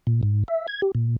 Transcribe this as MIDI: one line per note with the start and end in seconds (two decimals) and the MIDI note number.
0.07 0.21 46
0.23 0.44 44
0.48 0.67 76
0.68 0.81 92
0.82 0.92 67
0.95 1.16 46